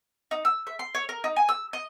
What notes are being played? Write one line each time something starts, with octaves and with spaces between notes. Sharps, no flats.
D#4
E6
E5
C6
C#5
A#4
D#4
G#5
E6
D#5